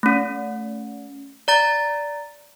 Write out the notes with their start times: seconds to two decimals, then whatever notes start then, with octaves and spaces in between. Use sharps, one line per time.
0.03 A3 C#4
1.48 D5 A#5 A6